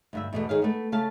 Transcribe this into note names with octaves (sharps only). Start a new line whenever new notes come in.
D2 G2 E5
E2 B2 A3
D#3 G#4 C#5 F5
A3 B3
C#3 A3 F5 A5